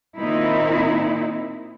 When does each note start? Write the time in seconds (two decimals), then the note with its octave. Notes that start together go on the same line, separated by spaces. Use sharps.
0.19 A#2 D#3 C4 D#4 E4